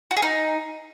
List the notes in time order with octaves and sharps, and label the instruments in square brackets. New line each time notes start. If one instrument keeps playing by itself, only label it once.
[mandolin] F#4
G#4
D#4